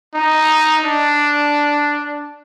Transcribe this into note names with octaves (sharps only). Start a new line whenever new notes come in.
D#4
D4